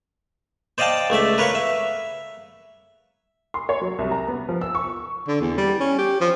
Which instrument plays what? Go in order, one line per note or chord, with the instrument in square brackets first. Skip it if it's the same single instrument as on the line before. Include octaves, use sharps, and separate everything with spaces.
[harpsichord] C5 D5 D#5 F5 G5 A5
C#2 A3 D5 E5
A#4 B4 C#5 F5 C#6
E5
[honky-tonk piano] C6
C#5
F#3
C2
A#5
B3
F3
E6
C#6
[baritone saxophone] D3
E2
G3
C#4
G4
F3